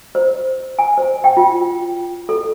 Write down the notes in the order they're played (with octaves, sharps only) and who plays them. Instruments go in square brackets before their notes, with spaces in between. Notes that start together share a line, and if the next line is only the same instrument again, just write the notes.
[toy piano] C5
G#5
C5
G5
F4
A4